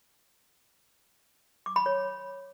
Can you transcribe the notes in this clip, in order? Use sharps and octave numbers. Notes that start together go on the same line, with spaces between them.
D6
B5
C#5